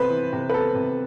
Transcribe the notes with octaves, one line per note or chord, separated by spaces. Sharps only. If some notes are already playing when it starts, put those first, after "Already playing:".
Already playing: C3 B3 B4 C5
E3
C3
B4
B3 A4
C3